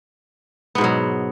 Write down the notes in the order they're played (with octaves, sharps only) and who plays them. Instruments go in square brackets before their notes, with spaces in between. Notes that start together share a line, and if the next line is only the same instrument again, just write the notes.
[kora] B3
G#2
B2
F#3